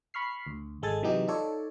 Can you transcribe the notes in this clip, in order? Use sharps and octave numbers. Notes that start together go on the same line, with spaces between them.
B5 C#6 F6 C7
D2
G#1 G#3 A4 G#5 A6
C3 E3 F#3 G#3 D#4 G4
D#4 F4 A4 C#5 D5